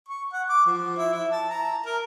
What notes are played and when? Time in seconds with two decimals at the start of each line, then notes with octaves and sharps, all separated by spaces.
0.09 C#6
0.33 F#5
0.49 D6
0.66 F3
0.97 E4
1.14 E4
1.31 A5
1.49 A#5
1.85 A#4